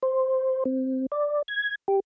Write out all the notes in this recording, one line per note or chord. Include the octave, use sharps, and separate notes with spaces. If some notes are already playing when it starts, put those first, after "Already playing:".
C5
C4
D5
G#6
G4